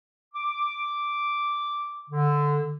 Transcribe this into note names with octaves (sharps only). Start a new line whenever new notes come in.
D6
D3